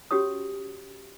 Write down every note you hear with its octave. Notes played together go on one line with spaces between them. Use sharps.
C#4 F#4 G4 C#5 D#6